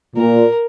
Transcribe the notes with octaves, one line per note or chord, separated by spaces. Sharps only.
A#2 A#4